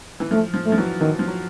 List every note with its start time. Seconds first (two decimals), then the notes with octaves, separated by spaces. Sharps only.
0.20 E3
0.31 F3 A3
0.54 F3
0.66 A3
0.72 F3
0.78 E3 F#3
1.00 D#3 E3 F#3
1.19 F3
1.27 F#3